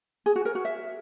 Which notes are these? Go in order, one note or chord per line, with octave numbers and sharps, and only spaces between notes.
G#4
F#4
A#4
F#4
E5